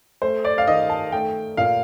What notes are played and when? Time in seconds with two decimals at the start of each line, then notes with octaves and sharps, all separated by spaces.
0.22 A3 C5
0.45 D5
0.58 F5
0.67 D#3 D#5
0.90 A5
1.12 A3 G5
1.57 A#2 F5